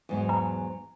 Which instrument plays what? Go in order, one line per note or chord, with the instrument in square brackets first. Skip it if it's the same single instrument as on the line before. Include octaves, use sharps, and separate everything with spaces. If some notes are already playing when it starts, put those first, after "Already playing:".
[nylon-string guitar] E2 G#2 F#3
[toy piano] A#5